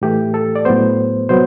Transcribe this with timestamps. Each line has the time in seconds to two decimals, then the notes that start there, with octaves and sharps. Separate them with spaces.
0.02 A2 E3 A3 G4
0.34 A4
0.56 D5
0.65 A2 F#3 B3 C5
1.29 C3 F#3 B3 C5